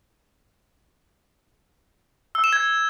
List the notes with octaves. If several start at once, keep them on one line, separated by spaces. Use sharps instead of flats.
E6
E7
G#6